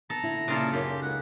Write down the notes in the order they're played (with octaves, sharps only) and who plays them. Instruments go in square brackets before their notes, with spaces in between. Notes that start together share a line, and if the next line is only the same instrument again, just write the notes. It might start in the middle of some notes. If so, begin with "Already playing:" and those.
[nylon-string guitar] B3 [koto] A4 [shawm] A#5
[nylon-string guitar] D3 E4
[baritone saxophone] A#2 [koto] C#3 F4 A4
[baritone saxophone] F#2 [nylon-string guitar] D#4 A#4 C#5 [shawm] G4
[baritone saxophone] C#2 [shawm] F#5